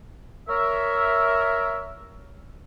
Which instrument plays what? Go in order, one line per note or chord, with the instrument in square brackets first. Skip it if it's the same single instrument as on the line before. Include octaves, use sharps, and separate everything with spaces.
[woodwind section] A#4 C#5 E5